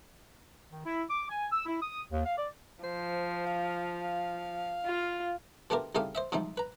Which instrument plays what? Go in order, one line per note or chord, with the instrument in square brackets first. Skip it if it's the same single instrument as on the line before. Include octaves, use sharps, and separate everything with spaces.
[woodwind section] D#3
E4
D6
G#5
E6
E4
D#6
D#2
F5
D5
[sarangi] F3 [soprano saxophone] C5
[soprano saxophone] F5
[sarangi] F4
[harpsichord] B2 A3 D4 F4 G4 A#4
C2 C#3 A3 D#4 G4 F5
C5 D#5 E5
G#2 C3 F3 G3 D#4
B4 A#5